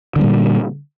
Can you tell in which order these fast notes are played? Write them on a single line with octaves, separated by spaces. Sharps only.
D3 F#3 G3 A#2